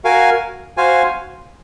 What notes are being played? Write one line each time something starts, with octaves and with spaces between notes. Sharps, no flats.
F#4 A#4 F5 G#5
F#4 C5 F5 G#5